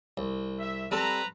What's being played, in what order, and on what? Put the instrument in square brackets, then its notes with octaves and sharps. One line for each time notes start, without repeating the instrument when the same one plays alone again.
[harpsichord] C2
[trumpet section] E5
[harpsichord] G3 C4 A4 [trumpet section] B4 A#5